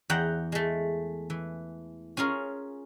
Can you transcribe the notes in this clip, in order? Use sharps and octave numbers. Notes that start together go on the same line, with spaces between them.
E2 F#5 G5 A#5
G#3 A3
E3
C#4 F4 G#4 A#4